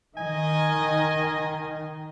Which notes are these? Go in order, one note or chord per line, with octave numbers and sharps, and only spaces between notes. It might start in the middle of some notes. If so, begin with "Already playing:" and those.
D#3 D#5 G#5